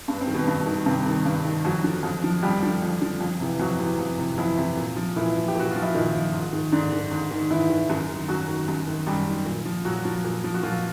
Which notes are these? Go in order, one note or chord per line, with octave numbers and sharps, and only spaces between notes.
G2 B3
C4
D#3
B2 B3
G2
D#3
G2 C3 C4
D#3
G2
D#3
F2 F#3 F#4
D3 F3
F2
D3 F3
F2 G3 G4
D3 F3
F2
D3 F3
F2
C3 E3
F2 F#3 F#4
C3 E3
F2
C3 E3
F2 E3 E4
C3 E3
A#2
F3
A#2 E3 E4
F3
G4
A#2 F#4
F3 F4
E4
A#2 D#3 D#4
F3
G#2
D#3
G#2 D3 D4
D#3
G#2
D#3
G#2 E3 E4
D#3
F#2
D#3
F#2 F#3 F#4
D#3
F#2
D#3
F#2 G3 G4
D#3
A#2
F3
A#2 F#3 F#4
F3
A#2
F3
F#4
A#2 F3 F4